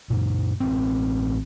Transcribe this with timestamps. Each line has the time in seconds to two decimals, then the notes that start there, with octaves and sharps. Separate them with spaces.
0.10 F#2 A#2
0.60 A1 C4